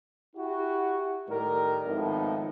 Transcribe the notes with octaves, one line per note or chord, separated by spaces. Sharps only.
E4 F#4 G4
A2 D#3 G3 A#4
G#1 A2 F3 B3 D#4 D#5